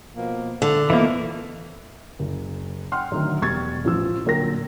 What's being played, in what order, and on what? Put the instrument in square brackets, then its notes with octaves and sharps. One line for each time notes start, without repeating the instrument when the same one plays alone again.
[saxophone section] B2 F3 A#3
[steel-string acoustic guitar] D3 [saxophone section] A3
[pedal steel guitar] E3 A#3 [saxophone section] F3 E4 [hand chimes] B3 D#5
[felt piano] F#1
F#5 G5 C6 F6
D3 D#3 F#3 A3
E1 G3 C#6 G#6 A6
A1 F3 E6
A#2 D3 F#3 A#4 G5 A#6